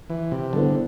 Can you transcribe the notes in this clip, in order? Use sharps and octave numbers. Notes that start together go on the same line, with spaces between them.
E3
C3
D3 G3 B3 E4 A4 C5